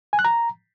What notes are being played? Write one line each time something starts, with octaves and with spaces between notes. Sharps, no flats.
G#5
F#6
A#5